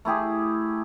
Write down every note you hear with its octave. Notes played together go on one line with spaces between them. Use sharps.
A3 E4 G4 G#4